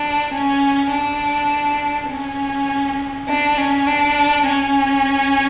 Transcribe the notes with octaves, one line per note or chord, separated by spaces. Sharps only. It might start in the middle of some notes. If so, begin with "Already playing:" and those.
Already playing: D4
C#4
D4
C#4
D4
C#4
D4
C#4